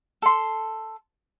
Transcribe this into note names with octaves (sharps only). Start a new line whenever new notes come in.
A4 C6